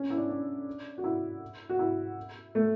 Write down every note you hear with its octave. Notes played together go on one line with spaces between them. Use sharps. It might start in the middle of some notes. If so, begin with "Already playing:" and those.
Already playing: C#4
E4
D4
D4
F#4
E4
F#4
E4
A3